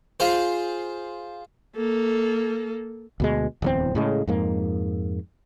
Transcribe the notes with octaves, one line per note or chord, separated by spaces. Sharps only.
F4 G#4 C5
A#3 A4
D2 B2 G#3
D1 E2 C4
A2 C#3 G#3
F2 G#2 A#3